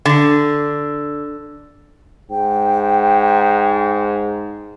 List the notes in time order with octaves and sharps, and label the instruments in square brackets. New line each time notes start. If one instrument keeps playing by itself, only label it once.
[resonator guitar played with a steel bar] D3
[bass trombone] G#2 [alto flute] G5